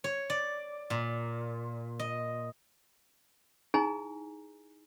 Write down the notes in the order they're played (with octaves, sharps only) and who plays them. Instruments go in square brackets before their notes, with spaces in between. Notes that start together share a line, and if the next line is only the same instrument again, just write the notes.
[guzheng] C#5
D5
A#2
D#5
[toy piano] D#4 E4 G#4 G#5 A#5